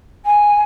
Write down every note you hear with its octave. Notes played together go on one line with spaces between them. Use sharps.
G#5